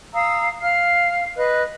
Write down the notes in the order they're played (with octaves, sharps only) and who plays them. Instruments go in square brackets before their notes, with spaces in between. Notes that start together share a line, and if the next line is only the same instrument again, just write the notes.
[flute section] F5 A#5 D#6 E6
F5 F6
B4 D#5 F#6